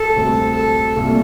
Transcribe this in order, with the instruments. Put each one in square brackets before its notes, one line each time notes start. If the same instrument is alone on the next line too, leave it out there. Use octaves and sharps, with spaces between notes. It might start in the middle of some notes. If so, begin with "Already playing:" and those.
Already playing: [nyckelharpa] A4
[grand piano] D2 C3 G3
[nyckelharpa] A4
[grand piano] C2 A#2 A3